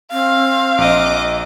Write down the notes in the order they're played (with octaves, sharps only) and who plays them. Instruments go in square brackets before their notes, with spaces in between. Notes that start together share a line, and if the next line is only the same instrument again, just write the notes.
[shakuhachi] C4 [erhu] F5
[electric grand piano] A#1 [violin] D#5 D6